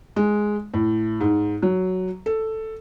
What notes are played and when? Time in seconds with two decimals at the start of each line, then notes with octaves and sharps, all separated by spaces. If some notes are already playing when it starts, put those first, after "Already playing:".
0.16 G#3
0.74 A2
1.21 G#2
1.62 F#3
2.26 A4